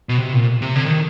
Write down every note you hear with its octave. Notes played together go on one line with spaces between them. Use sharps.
B2
C3
A#2
C3
D3
D#3